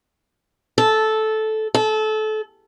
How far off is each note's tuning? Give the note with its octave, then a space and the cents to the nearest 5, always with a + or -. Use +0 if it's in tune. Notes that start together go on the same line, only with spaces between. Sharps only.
A4 -10
A4 -25